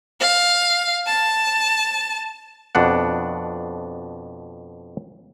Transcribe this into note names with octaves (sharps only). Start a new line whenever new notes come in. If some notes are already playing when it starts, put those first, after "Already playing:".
F5
A5
F2 B2 D4 F#5